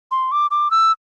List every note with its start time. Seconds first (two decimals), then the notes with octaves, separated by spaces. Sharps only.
0.11 C6
0.32 D6
0.51 D6
0.71 E6